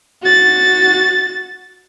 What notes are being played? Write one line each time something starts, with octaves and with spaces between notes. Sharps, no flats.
F#4 A6